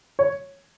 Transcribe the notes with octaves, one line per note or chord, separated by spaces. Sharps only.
C#5